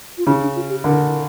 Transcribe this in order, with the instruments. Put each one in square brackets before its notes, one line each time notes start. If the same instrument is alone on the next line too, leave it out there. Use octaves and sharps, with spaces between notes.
[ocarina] F4
[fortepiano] C#3 [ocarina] E4
[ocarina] D4
F4
G4
[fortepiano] D3 [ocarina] A#4